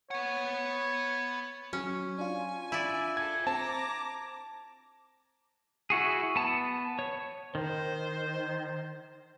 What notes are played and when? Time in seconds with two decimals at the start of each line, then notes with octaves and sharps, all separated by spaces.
0.11 B3 C#5 F#5
1.73 F#3 C#4
2.18 D4 F4 G#5
2.72 E4 D5
3.17 G#4 A4 G#6
3.47 C4 A5 A#5 D6
5.90 E4 F#4 G#4
6.36 B3 A5
6.99 C#5
7.55 D#3 C5